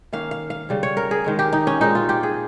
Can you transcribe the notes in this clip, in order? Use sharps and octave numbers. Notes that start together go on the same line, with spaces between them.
D#3 A#3 C#4 F5
F5
F5
C#3 G3 C#4
C#5
A#4
G#4
D#3 G#3 C#4
G4
D#4
C#4
A#2 G#3 C4 D#4
F4
G4
G#4